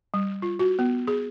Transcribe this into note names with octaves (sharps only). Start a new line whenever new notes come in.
G3
F4
F#4
B3
G#4